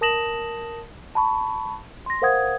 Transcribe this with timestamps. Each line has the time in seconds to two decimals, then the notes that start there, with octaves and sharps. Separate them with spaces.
0.01 A#4 A5 D#6 A#6 E7 F#7
1.15 A5 B5 C#6
2.06 C6 A#6
2.22 A#4 C5 F5 F#5 D#6 G#6